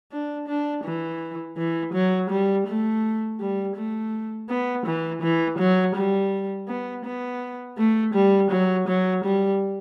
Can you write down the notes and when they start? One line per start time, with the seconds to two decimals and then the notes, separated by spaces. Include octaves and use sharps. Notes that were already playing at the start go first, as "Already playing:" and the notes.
0.12 D4
0.48 D4
0.84 E3
1.57 E3
1.94 F#3
2.30 G3
2.67 A3
3.40 G3
3.76 A3
4.49 B3
4.86 E3
5.22 E3
5.59 F#3
5.96 G3
6.68 B3
7.05 B3
7.78 A3
8.14 G3
8.51 F#3
8.88 F#3
9.24 G3